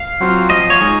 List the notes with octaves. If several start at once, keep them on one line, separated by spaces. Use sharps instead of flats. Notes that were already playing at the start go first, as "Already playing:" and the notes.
Already playing: F5
F#3 C4 F4
F3 D#5
C#5
G#3 D#4